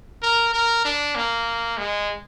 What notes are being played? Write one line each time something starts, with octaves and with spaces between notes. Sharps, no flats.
A#4
A#4
D4
A#3
G#3